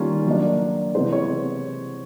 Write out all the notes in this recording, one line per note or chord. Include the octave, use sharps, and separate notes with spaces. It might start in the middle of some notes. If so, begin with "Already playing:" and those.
Already playing: D#3 G3 A#3 C#4 F4
F#3 A#3 D4
C3 E3 G#3 B3 E4 C5
C#5